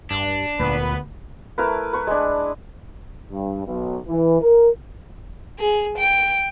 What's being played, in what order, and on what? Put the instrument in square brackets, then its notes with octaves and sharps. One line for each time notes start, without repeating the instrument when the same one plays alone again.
[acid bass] G2 [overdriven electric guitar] D4
[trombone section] G#1 B3 B4 [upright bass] D2 [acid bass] A#2
[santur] A3 E4 A#4 B4
B4 C#6
G#3 D4
[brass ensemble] G2
B1
E3
A#4
[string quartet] G#4
G5